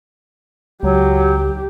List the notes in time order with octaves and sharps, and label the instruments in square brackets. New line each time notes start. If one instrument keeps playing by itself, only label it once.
[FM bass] C#2 [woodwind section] F#3 [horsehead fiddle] G4